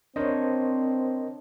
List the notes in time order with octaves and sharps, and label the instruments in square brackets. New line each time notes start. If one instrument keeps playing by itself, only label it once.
[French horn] C4 [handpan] D4 C#5 [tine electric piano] A#4 C5 D#5